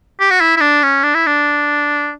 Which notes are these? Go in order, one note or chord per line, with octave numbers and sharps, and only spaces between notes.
G4
F#4
E4
E4
D4
C#4
D4
E4
D4